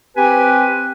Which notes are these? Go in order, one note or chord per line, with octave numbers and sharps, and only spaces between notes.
C4 G4 B4 G#5